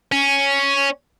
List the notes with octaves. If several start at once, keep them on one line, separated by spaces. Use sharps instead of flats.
C#4